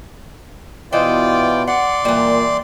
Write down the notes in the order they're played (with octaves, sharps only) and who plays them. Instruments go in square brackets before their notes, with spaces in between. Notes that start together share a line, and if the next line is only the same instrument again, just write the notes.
[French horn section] B2 E4 [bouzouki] E3 C5 D#5 [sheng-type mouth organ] F4 D5 G5
[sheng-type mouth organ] D5 C6 [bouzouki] F#5
[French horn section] A#2 A#3 [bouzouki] E3 G3